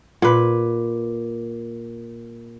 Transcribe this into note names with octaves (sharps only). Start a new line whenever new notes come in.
A#2 B4